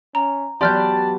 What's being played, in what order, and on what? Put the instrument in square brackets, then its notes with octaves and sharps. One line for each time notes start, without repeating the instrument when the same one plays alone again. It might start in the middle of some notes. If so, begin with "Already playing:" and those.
[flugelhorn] C#4 [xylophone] A#5
[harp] F#3 B3 G4 [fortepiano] D5 [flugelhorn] A5 [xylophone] C6 F6 G6